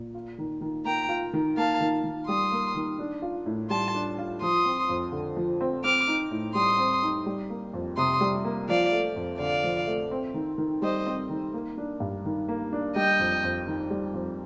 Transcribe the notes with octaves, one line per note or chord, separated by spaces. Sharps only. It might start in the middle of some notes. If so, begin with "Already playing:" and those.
Already playing: A#2
F4
D#3
D#3
A#3 G5 A#5
F4
D#3
A#3 F5 A5
D#3
D#3
G3 C6 D#6
A#3
D#3
D4
F4
A2
G3 A5 C6
D4
F4
F3 C6 D#6
C4
F2
D3
F3
C4
C4 D6 F6
D#4
A2
G3 C6 D#6
C4
D#4
G3
A#3
F2
C3 C6 D#6
G3
A#3
F3 D5 F5
A3
F2
D3 D5 F5
F3
A3
C4
D#3
D#3
G3 C5 D#5
C4
D#3
A#3
D4
G2
D#3
A#3
D4
G3 D#5 G5
F2
F2
D#3
G3
F2